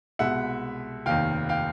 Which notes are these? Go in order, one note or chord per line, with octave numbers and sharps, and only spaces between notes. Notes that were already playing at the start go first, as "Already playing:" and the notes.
C2 B2 G#3 E5 F#5
F1 D#2 D#3 F5 G5
F5 G5